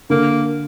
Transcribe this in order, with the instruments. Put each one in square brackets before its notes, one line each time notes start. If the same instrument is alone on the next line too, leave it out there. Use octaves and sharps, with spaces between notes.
[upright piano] D3 [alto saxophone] A#3